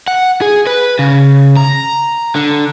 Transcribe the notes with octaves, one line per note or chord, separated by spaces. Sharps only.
F#5
G#4
B4
C#3
A#5
D3